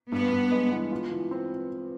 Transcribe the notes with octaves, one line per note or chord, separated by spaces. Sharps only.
G2 B3
G2
G#3
E3
F4
E3
C4